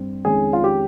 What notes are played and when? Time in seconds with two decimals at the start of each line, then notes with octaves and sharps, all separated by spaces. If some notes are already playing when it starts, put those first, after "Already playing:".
Already playing: G2 G3 C4
0.25 F2 D#3 G#3 C#4 G#4
0.53 F4
0.64 G4